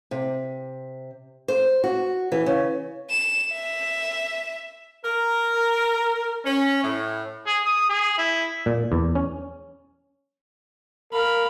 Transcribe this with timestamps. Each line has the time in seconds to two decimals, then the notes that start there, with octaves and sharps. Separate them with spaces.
0.11 C3
1.48 C5
1.84 F#4
2.32 E3
2.46 C#3
3.10 E7
3.52 E5
5.05 A#4
6.45 C#4
6.83 A2
7.46 G#4
7.65 D#6
7.90 G#4
8.18 E4
8.66 A#2
8.92 E2
9.15 C#4
11.13 A#4 F5 B5